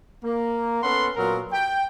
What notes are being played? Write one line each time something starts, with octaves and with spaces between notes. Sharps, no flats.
A#3
B3 C#4 A4 F#5 C6
A#2 F#3 B3 A#4
G5